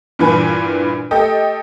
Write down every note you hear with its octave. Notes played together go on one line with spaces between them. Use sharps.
G2 A#2 E3 B4 G#5
A3 G4 A4 D#5 G5